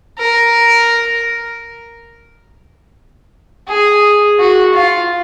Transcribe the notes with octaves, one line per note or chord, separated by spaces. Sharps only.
A#4
G#4
F#4
F4